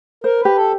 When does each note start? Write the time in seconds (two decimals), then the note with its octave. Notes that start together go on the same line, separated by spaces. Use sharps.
0.24 A#4 C5
0.40 B4
0.45 G4
0.56 A4